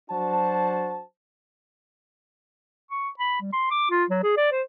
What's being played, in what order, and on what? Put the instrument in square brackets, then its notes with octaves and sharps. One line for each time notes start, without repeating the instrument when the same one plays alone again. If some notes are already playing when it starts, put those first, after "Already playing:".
[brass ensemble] F#3 D4 F#4 C5 A5
[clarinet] C#6
B5
G3
C6
D6
F4
F#3
G#4
D5
C5